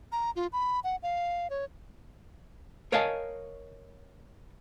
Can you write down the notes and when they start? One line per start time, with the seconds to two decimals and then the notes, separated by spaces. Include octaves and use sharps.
0.12 A#5
0.36 F4
0.53 B5
0.84 F#5
1.03 F5
1.50 C#5
2.92 A#4 C#5 D#5 F5 G#5 A5